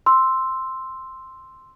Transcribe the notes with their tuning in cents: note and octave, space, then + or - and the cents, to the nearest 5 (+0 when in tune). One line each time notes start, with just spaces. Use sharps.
C6 +0 E6 +0